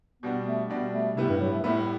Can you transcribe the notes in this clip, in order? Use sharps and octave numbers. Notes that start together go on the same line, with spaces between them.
B2 G3 B3 D4
A3
B2 G3 B3 D4
A3
A2 C3 G3 B3 E4
G2
F#3
A3
A2 G3 A3 B3 E4